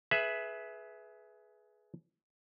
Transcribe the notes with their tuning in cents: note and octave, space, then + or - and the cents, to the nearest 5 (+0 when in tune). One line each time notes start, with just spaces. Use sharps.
G#4 +20 B4 +0 E5 +0